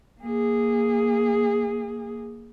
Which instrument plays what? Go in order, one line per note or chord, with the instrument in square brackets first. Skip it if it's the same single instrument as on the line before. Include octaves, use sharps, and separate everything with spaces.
[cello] A#3 G#4